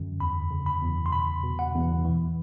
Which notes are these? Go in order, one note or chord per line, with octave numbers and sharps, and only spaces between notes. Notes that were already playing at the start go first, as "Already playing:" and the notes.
Already playing: F#2 D3
E2 B5
C#3
B5
E2
C6
B2 B5
B2
F#5
E2
E3